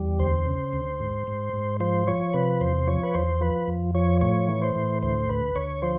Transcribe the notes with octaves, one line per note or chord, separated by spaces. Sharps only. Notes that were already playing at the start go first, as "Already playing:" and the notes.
Already playing: E2 G3
D2 C5
C#3
D2
G#2
G#2
G#2
F3 C5
F3 C#5
C3 B4
E2 C5
F3 C#5
B4
E2 C5
F3 B4
F2
F3 C#5
A2 C#5
E3
C5
A2
D2 C5
D2 B4
D2 C#5
F3 C5